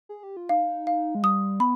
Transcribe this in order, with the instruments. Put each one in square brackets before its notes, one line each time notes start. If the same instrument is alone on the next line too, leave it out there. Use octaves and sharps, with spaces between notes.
[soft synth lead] G#4
G4
F4
[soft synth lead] D#4 [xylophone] F5
[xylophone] F5
[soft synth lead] G#3
[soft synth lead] G3 [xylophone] D#6
[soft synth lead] B3 [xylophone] B5